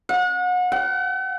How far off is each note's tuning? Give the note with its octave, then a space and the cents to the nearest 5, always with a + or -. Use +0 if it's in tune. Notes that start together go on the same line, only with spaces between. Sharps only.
F#5 -35
F#5 +45